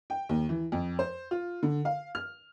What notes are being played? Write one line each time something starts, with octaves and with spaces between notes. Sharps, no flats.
G5
D#2
E3
F2
C5
F4
D3
F5
F6